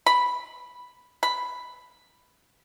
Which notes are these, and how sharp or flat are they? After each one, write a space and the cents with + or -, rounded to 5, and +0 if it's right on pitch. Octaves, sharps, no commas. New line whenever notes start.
B5 +0
B5 +5